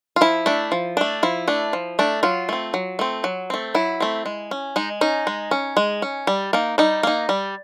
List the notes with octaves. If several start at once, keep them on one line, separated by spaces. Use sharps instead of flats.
F4
F3 E4
A3 D4
F3
A3 D4
F3 E4
A3 D4
F3
A3 D4
F#3 F4
A3 C4
F#3
A3 C4
F#3
A3 C4
F#3 E4
A3 C4
G#3
C#4
G#3 D#4
C#4 D#4
G#3
C#4
G#3
C#4
G3
A#3 D#4
G3 D#4
A#3 D#4
G3